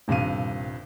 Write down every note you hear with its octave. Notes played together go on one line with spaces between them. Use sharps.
D#1 G2 C3 F5 D#7